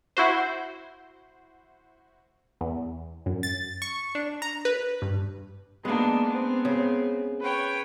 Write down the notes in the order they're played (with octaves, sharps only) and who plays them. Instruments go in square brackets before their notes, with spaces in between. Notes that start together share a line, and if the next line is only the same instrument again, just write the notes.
[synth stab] E4 F#4 C5
E2
F#2
A6
C#6
D4
A#5
B4
G2
[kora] G#3 D#4 [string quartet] A#3 B3 D4
[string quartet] B3 C4
[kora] C#3
[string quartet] B4 C#5 G5